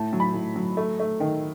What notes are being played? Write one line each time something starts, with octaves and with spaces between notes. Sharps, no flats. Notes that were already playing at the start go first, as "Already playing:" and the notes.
Already playing: A2 A5
F#3
B5
A2
F#3
A3
A3
D#3